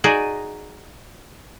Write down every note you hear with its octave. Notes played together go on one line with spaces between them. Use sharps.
D#4 F#4 G#4 D5 D#5